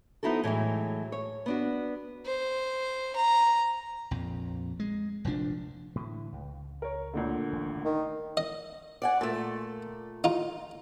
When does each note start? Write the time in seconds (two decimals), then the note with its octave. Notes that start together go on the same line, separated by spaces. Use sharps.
0.23 F3 B3 D#4 E4 F#4 A4
0.44 A2 E3 F#3 G#3
1.12 C#5
1.46 B3 D4 F#4
2.26 C5
3.16 A#5
4.11 A#1 F2
4.80 G#3
5.24 F1 A#1 F3 D4
5.95 A2 D3 E3
6.32 C#2
6.82 A#4 C#5
7.14 D2 A#2 D3
7.52 D#1 A1
7.85 D#3
8.37 D#5
9.02 D5 F#5 G#5
9.21 A#2 A3
10.24 D#4 F4